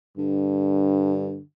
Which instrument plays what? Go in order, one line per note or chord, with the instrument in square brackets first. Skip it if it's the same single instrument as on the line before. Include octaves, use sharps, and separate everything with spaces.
[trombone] G2 [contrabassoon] D3